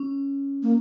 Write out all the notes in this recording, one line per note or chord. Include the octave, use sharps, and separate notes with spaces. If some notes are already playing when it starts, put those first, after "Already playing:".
Already playing: C#4
A#3